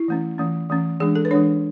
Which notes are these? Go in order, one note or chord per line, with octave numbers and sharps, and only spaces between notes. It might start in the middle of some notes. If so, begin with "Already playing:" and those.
Already playing: E4
E3 A3 C#4
E3 A3 C#4
E3 A3 C#4
E3 G#3 D4 G#4
A4
B4
E3 G#3 D4 C#5